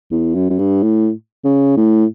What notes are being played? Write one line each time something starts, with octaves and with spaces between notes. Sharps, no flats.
E2
F#2
F#2
G2
A2
C#3
A2